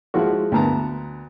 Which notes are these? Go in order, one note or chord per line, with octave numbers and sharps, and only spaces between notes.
F3 G#3 E4 F#4
D2 B3 A5 A#5